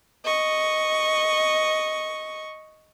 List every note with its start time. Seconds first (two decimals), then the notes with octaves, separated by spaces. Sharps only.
0.24 D#5 C#6